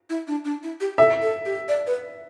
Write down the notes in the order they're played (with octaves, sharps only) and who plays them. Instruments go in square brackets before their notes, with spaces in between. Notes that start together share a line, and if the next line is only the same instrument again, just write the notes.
[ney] E4
D4
D4
E4
G4
[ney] A4 [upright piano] E5
[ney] A4
G4
D5
B4